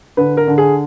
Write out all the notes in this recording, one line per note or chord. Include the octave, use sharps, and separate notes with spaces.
D3 B4
A#4
D3
G#4